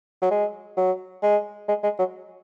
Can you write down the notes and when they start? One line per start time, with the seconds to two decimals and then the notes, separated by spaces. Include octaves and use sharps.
0.22 F#3
0.31 G#3
0.77 F#3
1.23 G#3
1.68 G#3
1.83 G#3
1.99 F#3